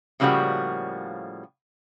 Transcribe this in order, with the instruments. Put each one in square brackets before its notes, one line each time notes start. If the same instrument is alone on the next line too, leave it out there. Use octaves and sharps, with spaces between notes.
[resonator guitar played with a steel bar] A2 C#3 F3 G3 A#3 F#4